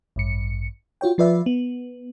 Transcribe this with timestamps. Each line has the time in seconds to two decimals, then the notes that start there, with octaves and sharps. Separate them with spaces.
0.16 A1 G2 C#7
1.01 F4 F#4 C#5 G5
1.18 F3 F4 B4 D5 E5
1.46 B3